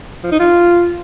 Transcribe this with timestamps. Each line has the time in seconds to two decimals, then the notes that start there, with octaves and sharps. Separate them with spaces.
0.23 F3
0.32 D#4
0.40 F4